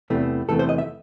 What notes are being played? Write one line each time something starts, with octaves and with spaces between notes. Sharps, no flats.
E2 C3 E3 A3
E2 C3 E3 A3 A4
C5
D#5
E5